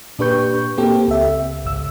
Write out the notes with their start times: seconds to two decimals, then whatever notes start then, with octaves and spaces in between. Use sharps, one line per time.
0.19 A#2 D4 G4 B4 C#6 G6
0.77 A#3 C4 G4 A4
1.08 C#2 E5
1.64 G#1 C#2 E6